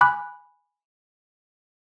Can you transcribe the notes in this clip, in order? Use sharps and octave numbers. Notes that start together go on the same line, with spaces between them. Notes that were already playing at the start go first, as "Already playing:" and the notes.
G#5 B5 D6 F#6